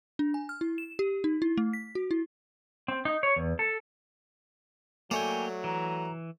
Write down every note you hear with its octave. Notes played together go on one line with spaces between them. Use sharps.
D4
G#5
F6
E4
E7
G4
D#4
E4
A3
B6
F#4
E4
C4
D#4
C#5
E2
A4
F#3 A3 A#3 C#5 D5 G5 G#5
E3 A#5